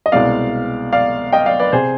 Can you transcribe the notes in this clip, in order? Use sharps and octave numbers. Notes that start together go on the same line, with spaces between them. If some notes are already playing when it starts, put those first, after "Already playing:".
D#5
C2 B2 G#3 C4 D5 F5
D5 F5
D#5 G5
D5 F5
B4 D5
C3 G#4 C5